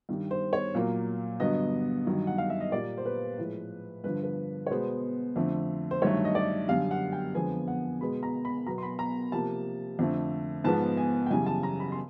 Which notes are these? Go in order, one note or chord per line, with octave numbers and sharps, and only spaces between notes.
G2 D#3 G3
C5
C#5
A#2 F#3 A#3
G2 D3 F#3 B3 D#5
G2 D#3 F#3
F#5
F5
E5
D#5
A#2 G3 A#3 D5
C5
B4
A2 F3 G#3
G2 D3 F3 B4
B4
C#5
B2 G#3 B3 C5
F2 D3 F3 A3
C5
G2 D#3 F#3 A3 C#5
D#5
D5
F#2 D3 G3 F5
F#5
G5
F2 D3 F3 G#3 B3 G#5
F#5
B2 G#3 B3 B5
A#5
B5
B2 F#3 B3 A#5
C6
B5
A#5
C3 F3 A#3 A5
F2 D3 F3 A3
G#2 F3 G#3 B3 A5
G#5
G5
F#2 C#3 E3 G3 G#5
A5
A#5
B5
C6